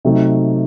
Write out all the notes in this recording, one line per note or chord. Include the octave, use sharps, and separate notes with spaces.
C3 F#3 A3 D#4